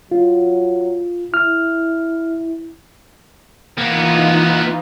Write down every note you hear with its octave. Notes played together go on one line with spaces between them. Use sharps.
F#3 F4
E4 F6
E3 A#3 B3 D#4 F4